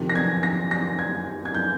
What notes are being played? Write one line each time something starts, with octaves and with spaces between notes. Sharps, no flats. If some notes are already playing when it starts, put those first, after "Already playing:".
Already playing: F2 C3 D#3
A#6
G#6
A#6
A#6
G#6
G#6
G6